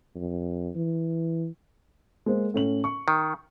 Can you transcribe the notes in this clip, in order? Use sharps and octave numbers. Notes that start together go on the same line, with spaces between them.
F2
E3
G#3 A#3 C5
A2 C#4 F#7
C#6
D#3